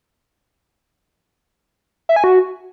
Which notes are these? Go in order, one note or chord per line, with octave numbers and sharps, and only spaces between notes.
E5
G#5
F#4